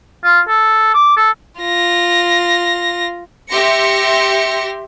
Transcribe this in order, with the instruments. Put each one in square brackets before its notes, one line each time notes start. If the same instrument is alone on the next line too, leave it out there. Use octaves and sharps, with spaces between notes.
[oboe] F4
A4
D6
A4
[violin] F4 A#6
[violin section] G4 E5 C6 A#6 C#7